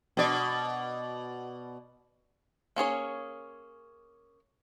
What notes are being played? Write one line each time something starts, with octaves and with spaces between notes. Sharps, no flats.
B2 D5
A#3 C#4 G#4 C#5